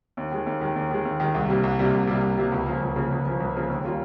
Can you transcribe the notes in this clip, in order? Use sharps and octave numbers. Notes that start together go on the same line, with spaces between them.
D#2
D#3 G#3
D#2
D#3 G#3
D#2
D#3 G#3
D#2
D#3 G#3
C2
C3 G3 A#3
C2
C3 G3 A#3
C2
C3 G3 A#3
C2
C3 G3 A#3
C#2
C#3 F3 A#3
C#2
C#3 F3 A#3
C#2
C#3 F3 A#3
C#2
C#3 F3 A#3
D#2
C#3 G3 A#3 F4